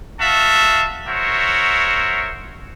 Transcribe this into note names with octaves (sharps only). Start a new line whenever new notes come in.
F#4 E5 F5 A5
F#4 A#4 C5 C#5 E5